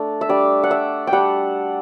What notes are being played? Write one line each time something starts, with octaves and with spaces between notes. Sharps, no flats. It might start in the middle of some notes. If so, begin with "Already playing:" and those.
Already playing: A3 D4
E5
G3 D4 D5
F#5
E5
G5
G3 D4 F#5